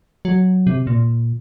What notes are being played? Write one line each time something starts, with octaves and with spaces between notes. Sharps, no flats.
F#3
C3
A#2